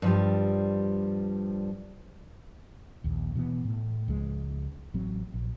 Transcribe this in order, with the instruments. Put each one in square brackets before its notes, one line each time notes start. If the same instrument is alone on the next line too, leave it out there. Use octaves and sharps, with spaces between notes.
[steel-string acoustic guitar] G2 F3 G3
[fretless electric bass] A#1 D#2
B2 E3 A#3 B3
A2
C#2 F3 G#3
A1 F#3 C4
A#1